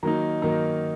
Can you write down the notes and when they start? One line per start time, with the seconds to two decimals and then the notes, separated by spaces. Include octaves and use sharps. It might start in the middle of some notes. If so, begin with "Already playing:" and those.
0.03 D#3 F#3 A#3 D#4 A#5
0.42 D#3 F#3 A#3 D#4 A#5